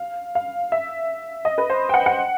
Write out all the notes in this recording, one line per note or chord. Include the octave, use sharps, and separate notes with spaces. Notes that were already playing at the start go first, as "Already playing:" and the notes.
Already playing: F5
F5
E5
D#5
B4
C5
G5
F#5
F#5